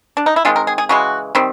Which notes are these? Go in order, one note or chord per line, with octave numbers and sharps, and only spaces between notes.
D4
D#4
E4
D#3 G#3 C4 F4
A#4
G#4
G#4
C#3 E3 G#3 F#4
D#3 G3 C4